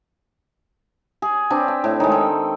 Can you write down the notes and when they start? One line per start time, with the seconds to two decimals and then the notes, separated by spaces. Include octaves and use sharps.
1.22 G#4
1.50 C4 D4 B4
1.68 G5
1.84 A2
2.00 D#3 G#3
2.12 A4 G5